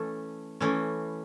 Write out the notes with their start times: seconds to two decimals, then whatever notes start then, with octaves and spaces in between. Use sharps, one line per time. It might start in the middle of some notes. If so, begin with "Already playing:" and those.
Already playing: E3 A3 C#4 A4
0.60 E3 A3 C#4